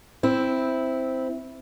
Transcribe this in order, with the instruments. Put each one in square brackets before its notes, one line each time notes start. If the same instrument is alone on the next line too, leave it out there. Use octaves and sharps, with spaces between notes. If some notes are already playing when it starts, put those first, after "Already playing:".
[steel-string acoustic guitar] C4 E4